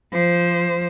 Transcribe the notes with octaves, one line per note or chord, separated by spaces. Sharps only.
F3 C5